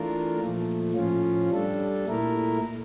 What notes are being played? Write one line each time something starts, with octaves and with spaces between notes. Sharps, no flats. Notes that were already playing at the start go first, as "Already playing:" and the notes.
Already playing: E3 A3 D4 F4 A#4
A#2 F3 A3
A2 F3 C#4 F4
G3 D4 A4
A#2 A3 E4 A#4